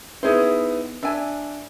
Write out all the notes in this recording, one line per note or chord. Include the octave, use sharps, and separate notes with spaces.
B3 D#4 E4 G#4 C5
D4 E5 G#5